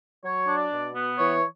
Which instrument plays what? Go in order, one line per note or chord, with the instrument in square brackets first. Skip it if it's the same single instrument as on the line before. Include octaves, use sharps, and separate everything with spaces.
[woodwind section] F#3 C#5
D4
D5
B2
B3
E3 C#5